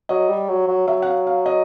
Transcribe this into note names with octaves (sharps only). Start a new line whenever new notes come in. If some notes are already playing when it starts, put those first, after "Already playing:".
F#3 D#5
G3
F#3
F#3
F#3 E5
F#5
F5
F5
D#5